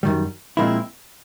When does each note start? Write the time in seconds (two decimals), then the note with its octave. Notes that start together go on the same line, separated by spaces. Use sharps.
0.03 F#2 D#3 G3
0.57 A#2 F3 G#3 C4 E4